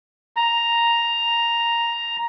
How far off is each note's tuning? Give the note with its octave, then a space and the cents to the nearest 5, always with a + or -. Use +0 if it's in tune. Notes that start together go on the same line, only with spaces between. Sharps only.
A#5 +5